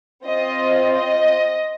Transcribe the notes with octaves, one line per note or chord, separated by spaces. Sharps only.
C4 F4 D#5
D#5